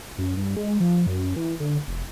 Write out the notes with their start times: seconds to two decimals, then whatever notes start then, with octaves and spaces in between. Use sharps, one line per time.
0.18 F#2
0.37 G2
0.56 G#3
0.80 F3
1.07 F#2
1.36 E3
1.60 D3
1.88 F1